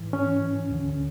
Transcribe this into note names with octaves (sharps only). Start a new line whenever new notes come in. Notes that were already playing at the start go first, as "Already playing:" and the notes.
Already playing: G#2 E3
C#4
D2 D3